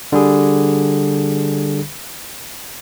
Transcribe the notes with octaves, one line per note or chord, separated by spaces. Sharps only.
D3 G3 G#4